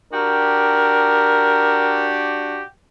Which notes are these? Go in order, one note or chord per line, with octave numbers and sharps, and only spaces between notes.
D4 F#4 G4 A#4